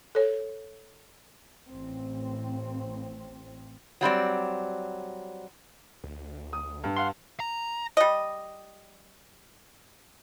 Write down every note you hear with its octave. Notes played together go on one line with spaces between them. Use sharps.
A4 C#5
A1 C4
F#3 G3 C4 D5
D2
D#6
G2
F5 F#5 C6
A#5
G3 D#5